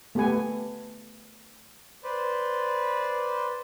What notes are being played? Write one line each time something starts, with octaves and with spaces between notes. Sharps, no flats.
A3 B3 G4 B4 G#5
B4 C5 D5